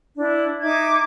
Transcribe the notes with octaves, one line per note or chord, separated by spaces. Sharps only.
D4 E4
D#4 E5 D6 G#6